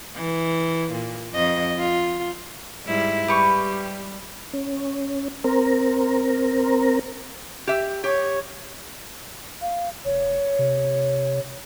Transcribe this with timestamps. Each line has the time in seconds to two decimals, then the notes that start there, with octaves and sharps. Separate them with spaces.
0.16 E3
0.92 A#2
1.33 F2 D#5
1.78 F4
2.85 G#2 G3 E4
3.28 G3 G4 B4 C#6
4.53 C#4
5.44 C4 A#4
7.67 G4 E5
8.04 G4 C#5
9.62 F5
10.05 F1 C#5
10.59 C3